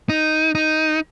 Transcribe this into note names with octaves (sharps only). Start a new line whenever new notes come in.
D#4
D#4